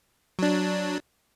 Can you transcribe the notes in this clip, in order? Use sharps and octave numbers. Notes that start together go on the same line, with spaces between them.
F#3 D4